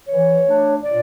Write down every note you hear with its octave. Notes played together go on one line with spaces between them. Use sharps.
E3 C#5
A3 D4
A#2 D5